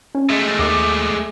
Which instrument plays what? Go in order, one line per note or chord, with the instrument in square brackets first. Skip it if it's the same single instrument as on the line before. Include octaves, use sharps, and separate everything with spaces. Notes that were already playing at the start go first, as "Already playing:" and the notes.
[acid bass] C#4
[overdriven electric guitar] G#3 A3
[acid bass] D#2 [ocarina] D6